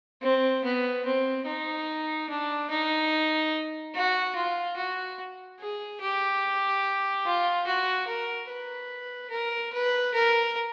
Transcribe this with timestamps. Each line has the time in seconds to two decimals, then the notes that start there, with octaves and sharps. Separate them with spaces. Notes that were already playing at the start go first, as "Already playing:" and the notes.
0.22 C4
0.64 B3
1.06 C4
1.46 D#4
2.29 D4
2.70 D#4
3.94 F#4
4.36 F4
4.77 F#4
5.60 G#4
6.00 G4
7.25 F4
7.67 F#4
8.08 A#4
8.49 B4
9.31 A#4
9.73 B4
10.14 A#4